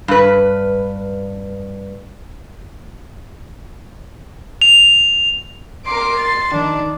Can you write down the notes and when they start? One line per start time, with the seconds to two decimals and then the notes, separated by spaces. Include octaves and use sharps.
0.08 G2 B4
4.62 F7
5.87 A#4 C6 D6
6.17 A6
6.53 D#3 D4